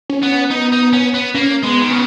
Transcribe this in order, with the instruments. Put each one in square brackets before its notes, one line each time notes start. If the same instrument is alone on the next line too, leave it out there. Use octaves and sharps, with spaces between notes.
[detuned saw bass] C#4
[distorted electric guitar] B3
[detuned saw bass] C#4
[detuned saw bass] B3 [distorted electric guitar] D#4
[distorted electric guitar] D#4
C#4
B3
[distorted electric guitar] A#3 [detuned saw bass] C#4
[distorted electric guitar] G#3 [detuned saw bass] B3
[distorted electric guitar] D#3
[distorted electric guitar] C#3 [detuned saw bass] B3